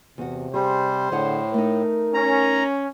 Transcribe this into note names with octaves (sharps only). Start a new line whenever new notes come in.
E2 C3 F#4
G3 G#4 C5
A2 D3 G#4 C#5 F#5
A3 D#4 A#4
C#4 A#5